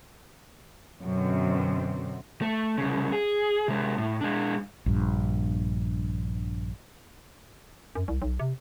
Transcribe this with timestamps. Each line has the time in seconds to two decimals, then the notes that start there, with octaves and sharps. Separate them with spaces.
1.01 F#2 B2 D3 C4
2.42 A3
2.78 C2 C#3
3.13 G#4
3.68 C3 G#3
3.98 A2
4.21 G#3 D4
4.86 A#1 G2
7.95 F#2
8.08 C2
8.22 B1
8.39 C3